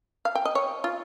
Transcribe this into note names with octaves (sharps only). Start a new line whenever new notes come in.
F5
G5
D#5
C#5
F4